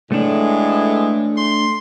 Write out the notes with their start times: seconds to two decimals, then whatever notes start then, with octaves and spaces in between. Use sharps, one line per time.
0.12 A2 E3 G#3 A3 D4
1.38 C6